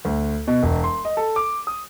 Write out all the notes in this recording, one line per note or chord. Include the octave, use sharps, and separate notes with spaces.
D2
B2
E1
C6
D#5
A4
D6
D#6